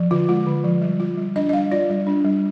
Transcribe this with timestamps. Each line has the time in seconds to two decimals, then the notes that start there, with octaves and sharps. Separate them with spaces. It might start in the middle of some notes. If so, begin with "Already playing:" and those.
Already playing: F3
0.11 D3 F4
0.29 G#3 F4
0.47 D3
0.64 F3
0.82 G3
1.00 F4
1.17 G3
1.36 D4 D#5
1.49 D#5
1.53 G3 F5
1.71 F4 D5
1.89 G3
2.07 D4
2.25 G3